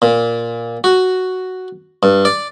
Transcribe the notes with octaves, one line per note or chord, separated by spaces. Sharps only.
A#2
F#4
G2
D5